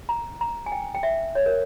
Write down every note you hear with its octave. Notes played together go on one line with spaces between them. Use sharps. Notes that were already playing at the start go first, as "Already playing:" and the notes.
A#5
A#5
G#5
G5
G5
E5
C#5
A#4